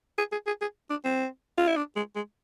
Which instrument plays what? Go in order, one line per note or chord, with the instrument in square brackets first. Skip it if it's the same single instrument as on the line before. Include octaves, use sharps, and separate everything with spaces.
[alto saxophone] G#4
G#4
G#4
G#4
D4
C4
F4
E4
D4
G#3
G#3